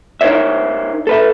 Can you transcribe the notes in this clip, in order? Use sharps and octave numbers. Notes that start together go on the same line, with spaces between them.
D#4 A#4 C5 C#5 E5
A4 B4 E5